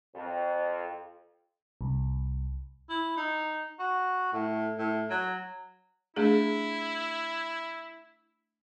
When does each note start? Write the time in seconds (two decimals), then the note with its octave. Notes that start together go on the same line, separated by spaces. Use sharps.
0.15 F2
1.81 C2
2.89 E4
3.16 D#4
3.79 F#4
4.32 A2
4.78 A2
5.10 F#3
6.16 A3 D4 E4 G#4